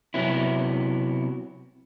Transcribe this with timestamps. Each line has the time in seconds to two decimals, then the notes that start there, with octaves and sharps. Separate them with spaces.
0.14 C3 F#3 B3 E4